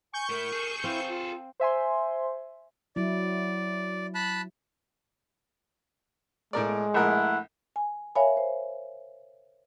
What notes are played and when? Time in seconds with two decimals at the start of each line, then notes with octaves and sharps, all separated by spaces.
0.13 G#5 C#6 G6
0.30 A2 E4 A#4
0.53 G#4 A4
0.84 C4 E4 F5
1.09 F4
1.60 C5 E5 G#5 C6
2.96 F#3 E4 D5
4.15 A5 B5 F#6
6.53 A2 G#3 A#4 D5
6.94 A#1 A3 E4 A#4 F#5
7.76 G#5
8.15 A#4 C#5 E5 F5 G#5 B5
8.37 C5